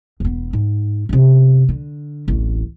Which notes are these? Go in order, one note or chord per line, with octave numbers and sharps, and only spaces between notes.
E1 B3
G#2
F#2 C3
D3
D1 A1